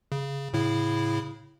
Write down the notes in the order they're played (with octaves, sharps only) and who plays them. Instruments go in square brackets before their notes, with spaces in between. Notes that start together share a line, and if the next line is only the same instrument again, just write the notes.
[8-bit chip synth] C#3
A2 C#3 E4